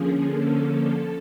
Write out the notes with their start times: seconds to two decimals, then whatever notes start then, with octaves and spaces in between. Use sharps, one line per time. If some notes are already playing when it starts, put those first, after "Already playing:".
Already playing: D3 F3 A#3 C#4 G#4
0.24 A4